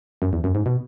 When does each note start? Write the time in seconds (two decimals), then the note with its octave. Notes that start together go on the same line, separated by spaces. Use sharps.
0.22 F#2
0.33 E2
0.44 F#2
0.55 G#2
0.66 B2